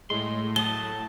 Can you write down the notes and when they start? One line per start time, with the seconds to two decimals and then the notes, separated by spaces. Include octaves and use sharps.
0.10 A2 G#3 C6
0.56 F#3 A3 A5 D#6 G7